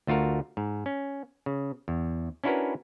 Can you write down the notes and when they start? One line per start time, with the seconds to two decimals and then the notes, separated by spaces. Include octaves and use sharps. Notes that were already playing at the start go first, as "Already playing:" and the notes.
0.07 D2 A3 F4 F#4 A#4
0.57 G#2
0.86 C#4
1.46 C#3
1.88 E2
2.44 C#4 D4 E4 F#4 A#4 B4